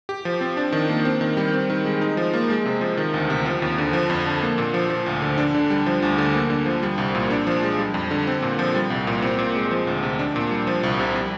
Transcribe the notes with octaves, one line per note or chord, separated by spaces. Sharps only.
G4
F3
C4
D4
D#3
A#3
C4
D#3
G3
C4
D#3
G#3
D#4
F3
A#3
G#3
C3
F3
D#3
D2
C3
F3
D#2
D3
F3
F2
D3
A#3
A#2
F3
F3
D2
D3
D4
D3
G3
F3
D2
D3
A#3
D3
F3
G3
C2
A#2
D4
F3
G#3
G3
F2
D3
C4
A#2
F3
G3
C2
A#2
C4
A#2
G#3
F3
D2
C3
D4
A#2
G3
F3
C2
C3
G3